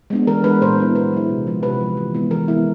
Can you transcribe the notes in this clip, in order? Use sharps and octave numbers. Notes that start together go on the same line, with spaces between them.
G#3 B3 D4
E3 A#4
G#3 B3 D4 B4
A#2 C5
F#3 B3 E4
A#2 B4
F#3 B3 E4
C3
F3 G#3
C3 B4
F3 G#3
E3
G#3 B3 E4
E3 A#4
G#3 B3 E4